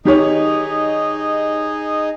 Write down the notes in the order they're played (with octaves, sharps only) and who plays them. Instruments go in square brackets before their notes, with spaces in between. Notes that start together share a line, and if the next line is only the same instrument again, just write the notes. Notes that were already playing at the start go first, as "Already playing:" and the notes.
[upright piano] D#3 G4 C#5 [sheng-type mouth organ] D#4 G#4 D#5